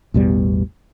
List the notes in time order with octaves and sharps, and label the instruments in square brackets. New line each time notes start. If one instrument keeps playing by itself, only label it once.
[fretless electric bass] A1 E2 B2 G3